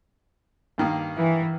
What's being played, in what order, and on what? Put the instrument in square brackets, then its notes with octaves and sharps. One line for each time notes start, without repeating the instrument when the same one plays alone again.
[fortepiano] G2 D#3 A#3
[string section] E3